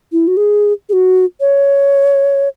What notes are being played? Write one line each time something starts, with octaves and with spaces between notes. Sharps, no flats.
E4
F#4
G#4
G#4
F#4
C#5